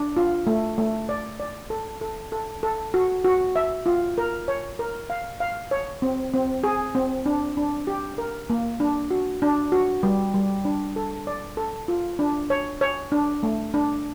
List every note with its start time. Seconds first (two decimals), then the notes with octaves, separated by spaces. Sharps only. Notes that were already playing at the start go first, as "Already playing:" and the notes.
Already playing: D4
0.17 F4
0.47 A3
0.78 A3
1.09 D5
1.40 D5
1.70 A4
2.01 A4
2.32 A4
2.63 A4
2.94 F#4
3.24 F#4
3.56 E5
3.86 F4
4.18 A#4
4.48 C#5
4.79 A#4
5.10 F5
5.40 F5
5.71 C#5
6.02 C4
6.33 C4
6.64 G#4
6.95 C4
7.26 D4
7.57 D4
7.87 G4
8.18 A#4
8.50 A#3
8.80 D4
9.11 F#4
9.42 D4
9.72 F#4
10.03 G3
10.34 G3
10.65 D4
10.96 A4
11.27 D5
11.57 A4
11.88 F4
12.19 D4
12.50 C#5
12.81 C#5
13.12 D4
13.43 A3
13.74 D4